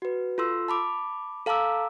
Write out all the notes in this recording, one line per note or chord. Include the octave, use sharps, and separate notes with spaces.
F#4 B4
F4 A4 C6 E6
A5 B5 D6
A4 F5 A5 A#5 D6 E6